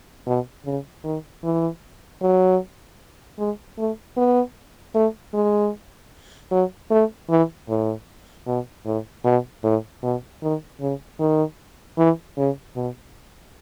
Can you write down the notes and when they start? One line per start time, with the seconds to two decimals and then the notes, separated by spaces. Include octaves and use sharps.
0.26 B2
0.65 C#3
1.04 D#3
1.44 E3
2.22 F#3
3.39 G#3
3.78 A3
4.17 B3
4.94 A3
5.34 G#3
6.51 F#3
6.91 A3
7.30 E3
7.69 A2
8.47 B2
8.86 A2
9.25 B2
9.64 A2
10.03 B2
10.42 D#3
10.81 C#3
11.20 D#3
11.98 E3
12.37 C#3
12.76 B2